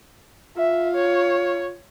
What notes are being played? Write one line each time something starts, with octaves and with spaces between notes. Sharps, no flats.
F4 E5
C#5